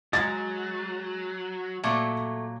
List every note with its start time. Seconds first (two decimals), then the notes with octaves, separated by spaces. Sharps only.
0.13 F#3 G#3 A#5 A6
1.84 A#2 F#3 A3